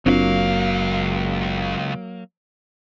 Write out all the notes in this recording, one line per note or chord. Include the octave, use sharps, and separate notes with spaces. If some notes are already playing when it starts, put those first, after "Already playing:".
F#1 C#2 F#3 A#3 C4 D4 F4 F5